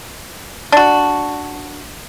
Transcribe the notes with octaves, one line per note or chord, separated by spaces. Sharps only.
D4 F#4